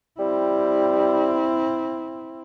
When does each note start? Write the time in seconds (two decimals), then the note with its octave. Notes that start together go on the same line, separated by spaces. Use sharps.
0.19 G3 C4 E4